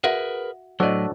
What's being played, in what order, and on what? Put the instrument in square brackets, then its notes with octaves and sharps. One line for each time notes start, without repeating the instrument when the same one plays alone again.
[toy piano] F#4 E5 F#5 [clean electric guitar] G#4 A#4 B4
[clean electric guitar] A2 F#3 [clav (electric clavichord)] D4 F#4 A4 [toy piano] C5 C#5 D#5